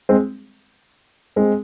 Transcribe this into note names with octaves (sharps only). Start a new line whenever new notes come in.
G#3 C4
G#3 C4